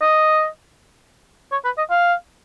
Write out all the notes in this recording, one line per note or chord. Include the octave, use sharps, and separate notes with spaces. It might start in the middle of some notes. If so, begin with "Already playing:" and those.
D#5
C#5
B4
D#5
F5